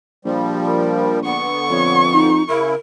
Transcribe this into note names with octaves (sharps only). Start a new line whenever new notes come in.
A#1 F3 G3
A#4
D3 B3 F#5 C#6
F2 C#5
D#4
C#3 E4 A#4